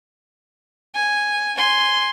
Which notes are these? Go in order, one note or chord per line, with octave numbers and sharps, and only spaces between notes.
G#5
G#5 C6